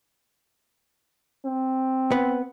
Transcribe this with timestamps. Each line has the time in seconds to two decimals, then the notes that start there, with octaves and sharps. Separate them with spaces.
1.45 C4
2.12 B3